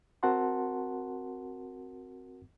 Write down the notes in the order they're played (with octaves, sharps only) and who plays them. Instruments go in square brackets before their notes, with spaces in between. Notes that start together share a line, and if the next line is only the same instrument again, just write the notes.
[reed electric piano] C4 F#4 A#4 F#5 A5 C6